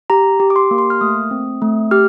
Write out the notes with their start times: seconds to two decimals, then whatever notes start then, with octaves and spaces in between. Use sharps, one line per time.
0.10 G4 A#5
0.40 G4
0.50 D6
0.56 C6
0.71 A#3
0.78 C6
0.90 F6
1.01 A3 D#6
1.31 C4
1.62 A3
1.91 G4 F6